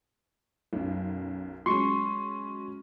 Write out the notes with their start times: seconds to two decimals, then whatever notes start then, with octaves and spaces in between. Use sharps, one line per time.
0.73 B1 F#2
1.66 F#3 G#3 C#4 C6 C#6